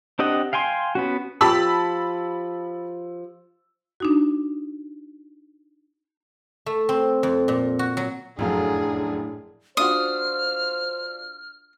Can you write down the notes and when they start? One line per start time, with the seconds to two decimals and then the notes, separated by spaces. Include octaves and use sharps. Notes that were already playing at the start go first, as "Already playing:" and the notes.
0.19 C4 D4 G4 D#5 F#5
0.53 F5 G5 G#5 C6
0.95 B3 C#4 F#4
1.41 F3 G4 A5 B5 E6
4.00 D4 D#4 F#4
6.66 A3
6.89 C4
7.23 F2
7.48 A#2
7.79 F#4
7.97 F#3
8.39 F1 F#2 A2 F#3 D4 G#4 A4 F5
9.77 D4 F4 F#4 C5 D#6 F6